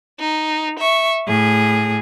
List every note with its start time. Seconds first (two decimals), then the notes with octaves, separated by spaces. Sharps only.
0.20 D#4
0.79 E5 C#6
1.27 A2 G#4